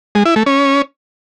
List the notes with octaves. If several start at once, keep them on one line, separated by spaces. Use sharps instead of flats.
G#3
E4
A3
C#4